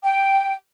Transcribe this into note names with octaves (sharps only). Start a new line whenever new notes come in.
G5